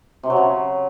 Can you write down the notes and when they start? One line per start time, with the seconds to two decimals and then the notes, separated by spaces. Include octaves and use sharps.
0.23 C3
0.30 F#3
0.36 C#3